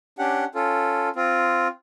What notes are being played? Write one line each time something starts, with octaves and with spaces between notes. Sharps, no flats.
C#4 D4 G4 F#5
C#4 F4 A4
C4 F4